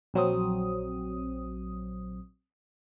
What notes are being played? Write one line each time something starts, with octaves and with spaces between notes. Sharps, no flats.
A#1 F#3 C4 D#6